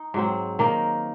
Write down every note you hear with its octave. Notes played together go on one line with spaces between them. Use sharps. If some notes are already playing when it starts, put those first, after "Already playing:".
Already playing: D#4
G#2 F#3 C4
D#3 A#3 D#4 A#4